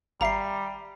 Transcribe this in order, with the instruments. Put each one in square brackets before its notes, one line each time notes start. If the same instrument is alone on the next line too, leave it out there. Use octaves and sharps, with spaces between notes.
[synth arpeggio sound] G#1 E5 [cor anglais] G3 [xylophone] A#5 C7